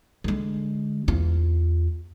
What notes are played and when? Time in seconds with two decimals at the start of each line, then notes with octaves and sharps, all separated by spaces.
0.24 D3 G#3
1.08 E2 F4